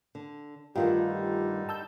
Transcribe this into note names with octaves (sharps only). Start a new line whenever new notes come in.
D3
G2 D3 D#3 G3 A3 D#4 F4 G4
A5 E6 G6